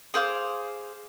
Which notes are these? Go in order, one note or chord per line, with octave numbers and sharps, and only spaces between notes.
G#4 C5 F5 D6